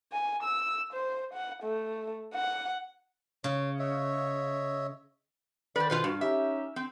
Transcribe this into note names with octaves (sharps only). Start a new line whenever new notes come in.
G#5
E6
C5
F#5
A3
F#5
C#3 C#5
C#5 D#5 E5
D3 D#3 B4 C5 D5
B2 D#3 F4 B4 C5
G2 F#4
C#4 D#4 G4 E5
C4